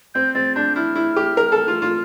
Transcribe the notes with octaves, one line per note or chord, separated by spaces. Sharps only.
C4 G6
C4 A6
D4 G6
E4 F6
E4
G4
A#4
A4
F4
F4